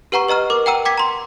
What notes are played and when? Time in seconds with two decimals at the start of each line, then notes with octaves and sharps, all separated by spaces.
0.12 G4 B4 F#5 A#5 C#6
0.28 B4 D#5 A#5 F6
0.50 A#4 D6
0.66 F#5 G5 A#5 E6 D#7
0.85 G5 D6 G#6 B6
0.98 A#5 C6